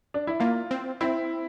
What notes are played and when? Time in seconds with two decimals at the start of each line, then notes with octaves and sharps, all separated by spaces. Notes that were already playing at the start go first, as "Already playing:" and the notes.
0.14 D4
0.27 E4
0.40 A#3 F4
0.71 C4
1.01 C4 E4